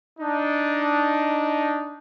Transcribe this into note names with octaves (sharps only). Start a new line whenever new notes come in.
D4 D#4